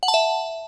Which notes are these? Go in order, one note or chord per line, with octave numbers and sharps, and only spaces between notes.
F#5
A5
E5